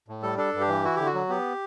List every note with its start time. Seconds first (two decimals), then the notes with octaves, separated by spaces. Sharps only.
0.08 A2
0.23 G3 A4
0.38 D4 A4
0.54 G2
0.61 G4
0.69 E3
0.84 E4 F#4
0.96 D3 G4
1.06 F#4
1.14 F#3
1.29 B3 G4